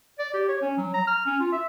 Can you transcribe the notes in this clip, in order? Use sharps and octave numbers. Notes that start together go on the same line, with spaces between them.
D5
G4
C#5
C#4
F#3
A#5
F6
C#4
F4
E5